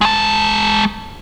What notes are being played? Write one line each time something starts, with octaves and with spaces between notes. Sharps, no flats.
G#3 A5